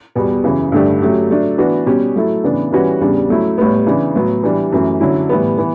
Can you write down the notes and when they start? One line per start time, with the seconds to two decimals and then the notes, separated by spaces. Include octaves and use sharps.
0.15 E2 B2 G3 B3
0.44 F#2 C#3 E3
0.72 G2 D3 A3 D4 G4
1.02 F#3 A3 C#4 G4
1.29 F#3 A3 D4
1.58 E3 B3 D4 F#4 B4
1.86 B2 G3 C#4 G4
2.16 F#3 A3 E4 A4
2.44 C#3 E3 B3 D4
2.73 E3 G3 C#4 F#4 B4
3.01 E2 C#3 G3 D4
3.30 F#3 A3 C#4 E4
3.58 A2 G3 B3
3.87 C#3 E3 B3 D4
4.15 A2 F#3 B3
4.44 E3 G3 D4
4.72 F#2 E3 A3
5.01 D3 F#3 C#4 E4
5.29 A2 E3 G3 B3
5.58 E3 B3